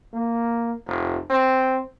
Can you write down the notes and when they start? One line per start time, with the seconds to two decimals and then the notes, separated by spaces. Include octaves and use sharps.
0.14 A#3
0.87 F1
1.30 C4